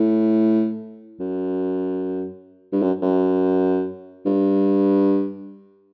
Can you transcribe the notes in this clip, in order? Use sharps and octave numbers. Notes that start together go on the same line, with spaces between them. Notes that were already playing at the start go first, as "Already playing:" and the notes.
Already playing: A2
F#2
G2
F#2
F#2
G2